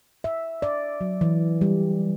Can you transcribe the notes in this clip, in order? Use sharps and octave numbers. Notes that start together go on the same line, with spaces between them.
E5
D5
F#3
E3
G3